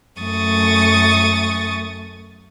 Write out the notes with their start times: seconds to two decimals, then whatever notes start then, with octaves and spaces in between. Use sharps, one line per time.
0.19 F#2 A3 C#6 D#6 A6